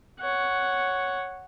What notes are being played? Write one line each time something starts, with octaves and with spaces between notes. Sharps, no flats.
C#5 F#5